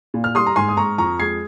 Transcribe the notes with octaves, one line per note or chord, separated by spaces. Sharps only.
A#2
F6
G3 C6 D#6
A#5
G#2 G#5 C6
D#6
G#2 A#5 C#6
F2 A#5 C#6
G#3 G#6 C7